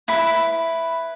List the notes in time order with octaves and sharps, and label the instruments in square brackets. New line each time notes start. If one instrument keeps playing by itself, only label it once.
[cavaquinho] E4 B4 B5